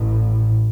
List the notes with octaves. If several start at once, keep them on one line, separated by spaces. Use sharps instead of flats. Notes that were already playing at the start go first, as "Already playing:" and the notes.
Already playing: A1 A2